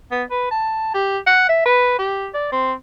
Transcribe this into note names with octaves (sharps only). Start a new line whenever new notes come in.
B3
B4
A5
G4
F#5
E5
B4
G4
D5
C4